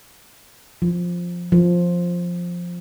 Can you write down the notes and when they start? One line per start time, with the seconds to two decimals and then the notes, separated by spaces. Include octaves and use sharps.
0.82 F3
1.52 F3